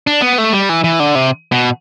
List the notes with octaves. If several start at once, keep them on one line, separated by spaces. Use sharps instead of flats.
D4
B3
A3
G3
E3
E3
D3
C3
B2